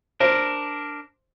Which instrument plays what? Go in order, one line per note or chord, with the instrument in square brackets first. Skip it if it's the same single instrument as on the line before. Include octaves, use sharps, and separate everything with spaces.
[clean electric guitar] D4 A#4 [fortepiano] C5